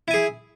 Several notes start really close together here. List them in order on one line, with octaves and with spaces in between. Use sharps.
E4 G#5 G#4